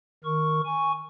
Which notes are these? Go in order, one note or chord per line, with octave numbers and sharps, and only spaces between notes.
D#3 A#4 C#6
G#5 C#6